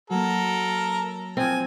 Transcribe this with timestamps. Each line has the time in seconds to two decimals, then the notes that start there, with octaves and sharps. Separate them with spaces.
0.10 F#3 A#3 A4 A#4
1.37 F3 C4 G#5